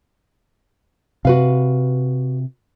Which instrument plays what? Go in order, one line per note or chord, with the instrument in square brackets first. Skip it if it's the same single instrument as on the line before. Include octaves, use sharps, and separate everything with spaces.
[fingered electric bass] C3 [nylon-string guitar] F#4 B4 F5